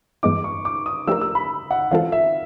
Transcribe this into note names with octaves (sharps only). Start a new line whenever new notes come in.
G2 E3 G#3 B3 D#4 D6
C#6
D6
D#6
F3 A3 D4 G4 A#4 E6
E6
B5
F#5
E3 G#3 C4 F4 A4 F5
E5